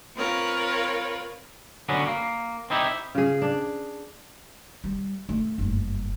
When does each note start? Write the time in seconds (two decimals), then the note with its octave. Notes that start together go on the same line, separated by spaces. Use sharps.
0.16 C4 F4 A#4 B4 C#5
1.89 D3 F#3 B3 C#4
2.07 A#3
2.70 C4 D#4 E4 G4
3.15 C#3 G#4
3.42 D4
4.84 G3
5.29 A3
5.58 F#1 G2